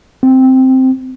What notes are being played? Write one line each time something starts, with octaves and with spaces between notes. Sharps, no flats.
C4